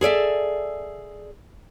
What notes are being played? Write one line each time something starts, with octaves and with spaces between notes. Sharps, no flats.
G#4 A4 D5 E5